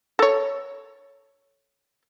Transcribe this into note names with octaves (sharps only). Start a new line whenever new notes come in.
A4 C#5